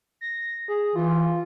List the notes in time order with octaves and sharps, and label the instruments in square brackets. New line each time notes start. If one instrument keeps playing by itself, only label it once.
[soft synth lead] A#6
G#4
[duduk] E3 [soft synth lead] F4